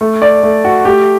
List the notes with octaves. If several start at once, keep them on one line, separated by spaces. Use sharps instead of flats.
A3
D5
A3
F#4
A3 G4